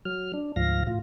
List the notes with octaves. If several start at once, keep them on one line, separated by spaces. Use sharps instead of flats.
F#3 F6
D4
D2 G#2 F3 F5 A#6
A2 F4